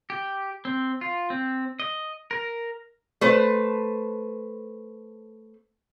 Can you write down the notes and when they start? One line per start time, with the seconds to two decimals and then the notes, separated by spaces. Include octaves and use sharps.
0.10 G4
0.65 C4
1.01 F4
1.30 C4
1.80 D#5
2.31 A#4
3.21 A3 B4 C5